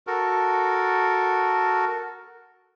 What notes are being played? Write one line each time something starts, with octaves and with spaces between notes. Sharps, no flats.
F#4 A4 A#4